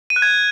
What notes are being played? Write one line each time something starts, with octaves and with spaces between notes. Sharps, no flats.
D#7
F#6
G#6